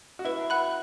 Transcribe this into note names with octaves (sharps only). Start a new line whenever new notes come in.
F#4
E4 B4
F#5 B5 F#6